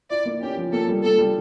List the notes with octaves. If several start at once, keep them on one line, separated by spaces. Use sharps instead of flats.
E4 D5
A#3
C#4 G4
F3
A#3 A4
G3
A#3 A4
G3